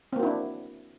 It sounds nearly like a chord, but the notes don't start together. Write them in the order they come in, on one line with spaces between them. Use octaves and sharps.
C4 A#3 F#4 E4 D4